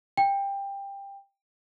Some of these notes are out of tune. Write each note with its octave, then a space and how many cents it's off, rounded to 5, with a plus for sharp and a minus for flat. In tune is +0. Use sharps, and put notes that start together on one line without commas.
G5 +20